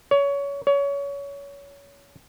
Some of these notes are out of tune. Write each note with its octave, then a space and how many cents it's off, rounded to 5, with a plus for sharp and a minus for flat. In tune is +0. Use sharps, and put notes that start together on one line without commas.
C#5 +25
C#5 +25